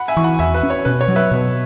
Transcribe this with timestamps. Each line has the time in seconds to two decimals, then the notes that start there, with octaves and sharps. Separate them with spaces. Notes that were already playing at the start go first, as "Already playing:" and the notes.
Already playing: F#5 B5
0.08 E5 G#5
0.17 E3 C#6
0.24 F#5 B5
0.39 E2 E5 G#5
0.54 B4 E5
0.63 C#4
0.70 C#5
0.85 B2 B4
1.01 C#5
1.08 F#3
1.16 B4 E5
1.31 B2